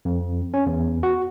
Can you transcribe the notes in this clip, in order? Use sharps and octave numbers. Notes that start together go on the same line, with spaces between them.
F2
C#4
E2
F#4